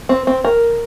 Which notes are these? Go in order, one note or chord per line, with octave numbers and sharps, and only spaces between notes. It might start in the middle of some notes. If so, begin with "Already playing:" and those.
C4
C4
A#4